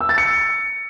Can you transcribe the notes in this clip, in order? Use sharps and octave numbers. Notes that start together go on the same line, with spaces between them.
E6
A6
C#7